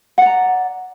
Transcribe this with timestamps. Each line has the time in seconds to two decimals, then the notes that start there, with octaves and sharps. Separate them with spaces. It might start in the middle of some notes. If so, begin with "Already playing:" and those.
0.18 F#5
0.22 D5
0.26 A#5